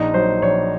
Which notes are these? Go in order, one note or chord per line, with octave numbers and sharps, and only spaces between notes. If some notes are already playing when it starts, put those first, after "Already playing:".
Already playing: A#1 D#4
F#3 C5
A#1 C#5